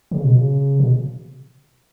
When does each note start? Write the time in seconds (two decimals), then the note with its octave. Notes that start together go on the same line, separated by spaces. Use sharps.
0.11 C#3
0.24 B2
0.36 C#3
0.80 B2